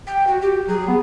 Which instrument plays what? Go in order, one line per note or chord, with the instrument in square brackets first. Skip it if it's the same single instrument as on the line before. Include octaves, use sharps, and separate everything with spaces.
[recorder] G5
F#4
G4
[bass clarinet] F#3 [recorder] G#4
[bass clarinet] B3